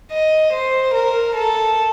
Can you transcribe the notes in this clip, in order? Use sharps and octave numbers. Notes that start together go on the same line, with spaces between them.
D#5
C5
A#4
A4